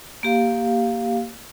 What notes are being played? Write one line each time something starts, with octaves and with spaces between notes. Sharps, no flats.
A#3 G4 F5